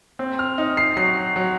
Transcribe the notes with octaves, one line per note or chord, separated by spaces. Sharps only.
C4
F6
D#4
C7
F#3 C7
F#3